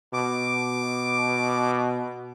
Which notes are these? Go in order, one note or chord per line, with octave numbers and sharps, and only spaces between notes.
B2 D6